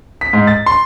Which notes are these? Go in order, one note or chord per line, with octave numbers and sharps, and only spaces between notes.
B6
G#2
A6
C6